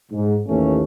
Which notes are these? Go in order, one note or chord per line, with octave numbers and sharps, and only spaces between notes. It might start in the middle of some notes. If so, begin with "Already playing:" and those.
G#2
A1 D#2 E3 A3 C#4